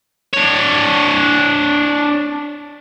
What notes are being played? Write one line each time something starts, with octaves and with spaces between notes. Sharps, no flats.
D4 C#5